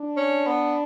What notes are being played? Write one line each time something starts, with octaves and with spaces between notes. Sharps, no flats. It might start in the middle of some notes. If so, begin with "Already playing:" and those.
Already playing: D4
C#4
B3